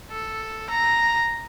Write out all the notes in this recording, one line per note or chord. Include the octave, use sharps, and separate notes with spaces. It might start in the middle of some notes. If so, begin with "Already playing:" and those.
A4
A#5